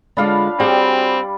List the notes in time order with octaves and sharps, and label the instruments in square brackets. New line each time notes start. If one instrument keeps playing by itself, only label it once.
[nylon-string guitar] D3 G#3 F4 [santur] D4 F5 [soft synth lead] B5
[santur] G3 [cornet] C4 [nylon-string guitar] F#4 G#4 F#5